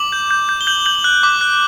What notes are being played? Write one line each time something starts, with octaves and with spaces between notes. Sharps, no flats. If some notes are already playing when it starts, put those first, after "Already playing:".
Already playing: D6 F#7
G6
G6
G6
G7
G6 F#7
G6 F#7
F#6
D6
F#6